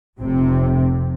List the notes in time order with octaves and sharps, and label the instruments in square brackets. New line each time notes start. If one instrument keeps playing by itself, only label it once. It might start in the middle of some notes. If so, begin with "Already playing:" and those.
[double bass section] F1 C3 C4